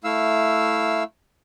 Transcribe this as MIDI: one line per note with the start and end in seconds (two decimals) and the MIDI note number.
0.04 1.03 57
0.04 1.03 64
0.04 1.03 77
0.04 1.03 88